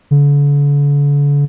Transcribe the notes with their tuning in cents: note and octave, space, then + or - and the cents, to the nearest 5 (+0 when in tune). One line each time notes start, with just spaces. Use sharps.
D3 -40